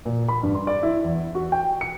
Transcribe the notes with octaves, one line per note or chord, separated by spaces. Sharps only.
A#2
B5
G2
C6
D5
E4
E2
F#4
G5
C#7